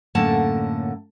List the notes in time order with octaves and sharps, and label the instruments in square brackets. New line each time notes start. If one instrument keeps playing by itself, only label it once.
[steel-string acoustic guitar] F#2 A2 D3 A#3 F#5 A5